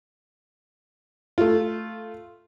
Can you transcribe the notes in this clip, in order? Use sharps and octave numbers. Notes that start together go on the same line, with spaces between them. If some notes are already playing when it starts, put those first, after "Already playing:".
A3 F4